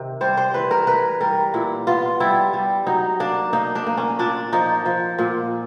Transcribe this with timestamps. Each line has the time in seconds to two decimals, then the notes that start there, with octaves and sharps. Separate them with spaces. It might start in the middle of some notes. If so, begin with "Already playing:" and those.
Already playing: C3 D#3
0.21 G3 C5
0.37 C5
0.54 E3 B4
0.71 A#4
0.87 E3 B4
1.21 G3 A#4
1.54 A#2 E4
1.87 B3 F4
2.20 G3 E4
2.53 G3
2.86 F#3 D#4
3.20 A#3 D4
3.53 A#3 D#4
3.75 D4
3.87 A#3
3.97 C#4
4.19 A#2 D4
4.52 F3 D#4
4.86 F3
5.19 A#2